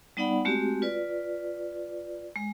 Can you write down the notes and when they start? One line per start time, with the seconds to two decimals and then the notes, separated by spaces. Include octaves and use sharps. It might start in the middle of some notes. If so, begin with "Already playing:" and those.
0.17 G3 B3 D#4 D5 F#5 B5
0.45 G#3 A3 C4 F#4 G4
0.82 F4 B4 D5
2.36 G#3